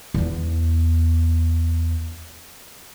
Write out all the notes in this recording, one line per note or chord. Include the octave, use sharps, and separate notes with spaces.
E2 B3